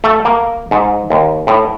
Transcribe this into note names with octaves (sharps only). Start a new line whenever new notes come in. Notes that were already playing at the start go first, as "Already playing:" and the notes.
A3
A#3
G#2
D#2
A2